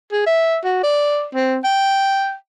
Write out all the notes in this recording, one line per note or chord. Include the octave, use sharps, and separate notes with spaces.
G#4
E5
F#4
D5
C4
G5